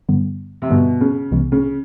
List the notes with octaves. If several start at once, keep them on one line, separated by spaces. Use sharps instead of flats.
G2 D3 G3 B3
C3
G2 B2 D3 G3 B3
C#3
C2 C3 E3 G#3 B3
C#3